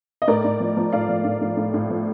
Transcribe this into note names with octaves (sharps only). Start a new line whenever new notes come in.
D#5
A2 A#4 D5
A2
F3
F3
A2 D5 F5
F3
A2
A2
A2
A2
F3